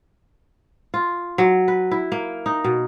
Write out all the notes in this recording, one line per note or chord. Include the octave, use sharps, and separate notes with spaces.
F4
F#3
B4
E4
A#3
D#4
B2